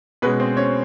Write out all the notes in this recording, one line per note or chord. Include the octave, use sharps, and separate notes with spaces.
B2 G#3 C#4 B4
C4 C5
C#4 C#5